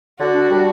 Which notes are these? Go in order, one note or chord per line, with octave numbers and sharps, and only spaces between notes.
D3 F#4
D4
G3